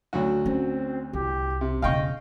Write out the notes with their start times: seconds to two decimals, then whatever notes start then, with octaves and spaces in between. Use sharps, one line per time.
0.13 D2 F#3 F#4
0.46 C4 C#4
1.13 C2 G4
1.61 C3
1.82 E1 C#3 D#5 F5 G5 C#6